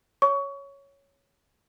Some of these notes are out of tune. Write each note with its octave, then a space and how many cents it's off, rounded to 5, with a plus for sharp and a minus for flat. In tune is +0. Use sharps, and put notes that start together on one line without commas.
C#5 +0 C#6 +25